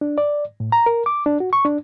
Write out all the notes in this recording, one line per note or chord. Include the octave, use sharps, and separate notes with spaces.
D4
D5
A2
A#5
A#4
D6
D4
F#4
C#6
D4